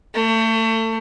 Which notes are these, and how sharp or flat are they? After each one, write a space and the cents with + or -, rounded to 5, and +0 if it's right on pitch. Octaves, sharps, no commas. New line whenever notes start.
A3 +30